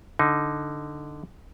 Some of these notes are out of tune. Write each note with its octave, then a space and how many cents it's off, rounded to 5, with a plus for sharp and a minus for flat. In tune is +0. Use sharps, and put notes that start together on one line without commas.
D3 +0 D#4 +0